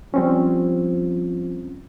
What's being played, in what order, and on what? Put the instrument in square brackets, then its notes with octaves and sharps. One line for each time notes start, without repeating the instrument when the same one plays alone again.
[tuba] F3 [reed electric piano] G3 C4 C#4